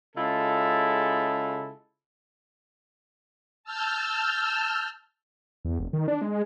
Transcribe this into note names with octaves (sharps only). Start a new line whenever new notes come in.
C#3 G#3 E4 F4 A4
A5 E6 F6 G6
E2
F1
D#3
D4
G#3